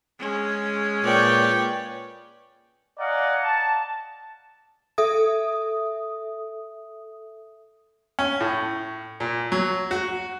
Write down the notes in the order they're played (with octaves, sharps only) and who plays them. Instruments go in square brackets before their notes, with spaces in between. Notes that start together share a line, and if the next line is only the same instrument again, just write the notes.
[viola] G#3 C#4
[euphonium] A#2 [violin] B4 C#5 [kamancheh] D5 G5
[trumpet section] D5 D#5 F5 F#5 G#5 A#5
A5
[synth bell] A4 E5 D#6
[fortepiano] C#4
A2
A#2
F#3
F#4